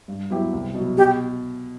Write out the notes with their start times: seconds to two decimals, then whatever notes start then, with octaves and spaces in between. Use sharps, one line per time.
0.08 G2
0.30 F#3 B3 E4 G4
0.53 C2
0.74 B2 F#3
0.97 B2 G4